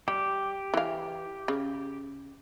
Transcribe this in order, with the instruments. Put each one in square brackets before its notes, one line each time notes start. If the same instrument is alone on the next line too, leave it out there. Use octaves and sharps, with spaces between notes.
[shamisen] G3 [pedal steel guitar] G4
[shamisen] E3 F5
C#3